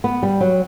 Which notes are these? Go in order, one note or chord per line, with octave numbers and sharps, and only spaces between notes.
B3
G3
F#3